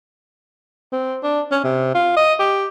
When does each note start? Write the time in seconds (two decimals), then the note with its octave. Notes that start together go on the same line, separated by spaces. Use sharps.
0.93 C4
1.23 D4
1.51 C#4
1.64 C3
1.95 F4
2.17 D#5
2.39 G4